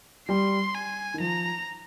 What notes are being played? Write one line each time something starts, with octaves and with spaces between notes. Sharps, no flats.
G3 C6
G#5
D#3
F3 A#5